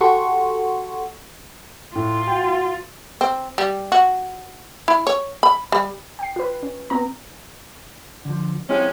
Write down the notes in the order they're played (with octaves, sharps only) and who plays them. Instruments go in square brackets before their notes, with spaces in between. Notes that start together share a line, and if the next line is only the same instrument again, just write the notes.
[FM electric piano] F#4 G4 A4 F#5 C6 C#6
[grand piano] A2 [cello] F4
[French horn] F#4 [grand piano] G5
[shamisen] C4
G3
F#4
E4
C#5
B5
G3
[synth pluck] G5 C7
F4 B4
C#4
B3 C4 A#5
[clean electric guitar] D3 F3
[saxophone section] F3 G#3 C#4 [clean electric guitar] C4 E4 G4